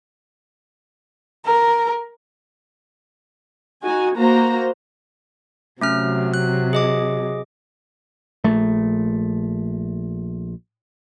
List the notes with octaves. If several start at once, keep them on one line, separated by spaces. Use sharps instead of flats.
A#4
D#4 F#4 G#5
A#3 F#4 C5 A#5
C3 F#3 A3 C#4 F6
F#6
G#4 D#5 D6
A#1 A3